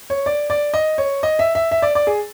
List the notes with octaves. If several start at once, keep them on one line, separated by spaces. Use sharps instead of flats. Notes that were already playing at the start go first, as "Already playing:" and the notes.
C#5
D5
D5
D#5
C#5
D#5
E5
E5
E5
D5
D5
G#4